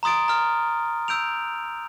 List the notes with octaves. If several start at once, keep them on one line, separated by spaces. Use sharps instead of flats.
A#5 C6 D#6 A6 D7
A#5 F6
E6 G6 D7 F7